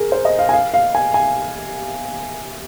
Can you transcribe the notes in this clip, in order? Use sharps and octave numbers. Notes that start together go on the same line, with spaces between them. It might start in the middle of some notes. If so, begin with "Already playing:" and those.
Already playing: G#4 A#4
C5
D#5
F5
G#5
F5
F5
G#5
G#5